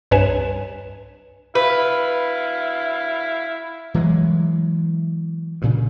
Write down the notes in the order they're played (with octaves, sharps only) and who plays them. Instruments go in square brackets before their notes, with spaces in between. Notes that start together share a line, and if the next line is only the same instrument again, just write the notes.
[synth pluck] C2 G2 B4 C#5 G#5 E7
[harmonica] E4 F5 [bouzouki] B4
[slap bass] E3 F#3 G#3
G2 A#2 C#3